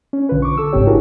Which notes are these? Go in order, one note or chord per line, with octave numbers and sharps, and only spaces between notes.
C#4
B1 D3 F4 B4
C#6 D6
A4 E6
G1 G#2 C#3 C4 G4 C#5
D4 E4 F#4 G#4 A#4